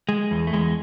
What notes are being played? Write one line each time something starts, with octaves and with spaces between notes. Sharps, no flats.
G#3
E2
A3
E2 G#3